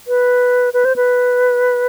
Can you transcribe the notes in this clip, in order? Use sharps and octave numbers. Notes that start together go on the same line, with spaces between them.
B4
B4
C5
B4